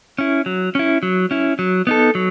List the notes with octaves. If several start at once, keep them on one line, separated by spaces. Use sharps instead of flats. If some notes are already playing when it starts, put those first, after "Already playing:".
C#4 E4
F#3
C#4 E4
F#3
C#4 E4
F#3
B3 D#4 A4
F#3